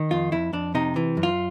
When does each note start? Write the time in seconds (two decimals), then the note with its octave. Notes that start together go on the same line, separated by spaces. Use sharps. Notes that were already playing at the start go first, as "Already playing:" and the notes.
Already playing: D#3
0.11 F2 F4
0.32 F2 E4
0.53 F2 D4
0.75 C3 D#4
0.96 E3
1.17 F#2
1.23 F4